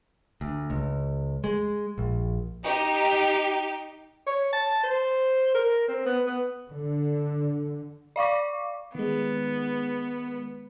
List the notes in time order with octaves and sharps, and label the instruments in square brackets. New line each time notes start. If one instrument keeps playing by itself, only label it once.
[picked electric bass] D2
C#2
G#3
A#1
[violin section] D#4 G4
[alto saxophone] C#5
A5
C5
A#4
C4
B3
B3
[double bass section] D3
[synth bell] D5 F5 C#6 D6
[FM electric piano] D#3 G#3 [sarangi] B3